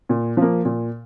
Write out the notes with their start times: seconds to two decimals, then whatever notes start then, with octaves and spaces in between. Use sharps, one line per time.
0.09 A#2
0.37 F3 A#3
0.65 A#2